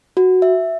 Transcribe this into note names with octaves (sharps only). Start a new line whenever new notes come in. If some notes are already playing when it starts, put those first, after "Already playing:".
F#4
E5